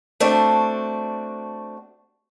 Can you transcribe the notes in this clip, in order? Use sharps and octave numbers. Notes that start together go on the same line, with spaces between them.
A3 C4 D4 F#4